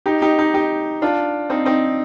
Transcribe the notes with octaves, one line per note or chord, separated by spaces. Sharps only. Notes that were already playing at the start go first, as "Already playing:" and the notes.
D#4 G4
D#4 G4
D#4 G4
D#4 G4
D4 F4
C4 D#4
C4 D#4